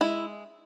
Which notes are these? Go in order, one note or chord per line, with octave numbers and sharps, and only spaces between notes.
G#3 E4